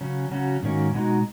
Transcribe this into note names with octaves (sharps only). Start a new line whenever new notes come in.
C#3 F#3 C#4
C#3 F#3 C#4 F#4
G#2 D#3 A#3 C#4 F#4
B2 G#3 D#4 F#4